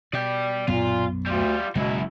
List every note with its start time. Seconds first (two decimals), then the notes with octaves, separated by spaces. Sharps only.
0.13 B2 D5 G5
0.68 B1 F#2 A#2 B3 F4
1.26 D2 G3 F4
1.75 F#1 F#2 B2 G#3 E4